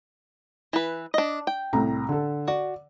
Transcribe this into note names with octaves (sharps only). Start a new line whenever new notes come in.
E3 B4
D4 D#5
G5
C2 A2 A#5
D3 A4
F#4 D5